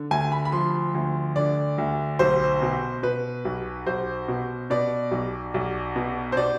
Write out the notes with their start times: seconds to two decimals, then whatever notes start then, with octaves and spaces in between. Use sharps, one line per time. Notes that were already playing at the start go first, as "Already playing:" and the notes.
Already playing: D3
0.11 D2 G#5
0.32 B5
0.45 B5
0.52 F3 C6
0.94 D2
1.36 D3 D5
1.78 D2
2.19 B1 C5
2.62 B2
3.03 B2 B4
3.45 B1
3.86 B1 C5
4.28 B2
4.70 B2 D5
5.11 B1
5.54 B1
5.96 B2
6.32 C5
6.37 B2 D5